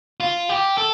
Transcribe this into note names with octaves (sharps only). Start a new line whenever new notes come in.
F4
G4
A4